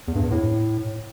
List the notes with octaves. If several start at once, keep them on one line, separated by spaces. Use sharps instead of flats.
E2
G2
E2
A2